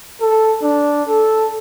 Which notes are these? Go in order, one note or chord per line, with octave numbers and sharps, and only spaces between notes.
A4
D4
A4